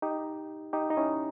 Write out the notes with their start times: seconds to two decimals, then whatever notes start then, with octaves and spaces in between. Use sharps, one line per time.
0.02 D#4 G4
0.73 D#4 G4
0.90 D#4
0.97 C#4 E4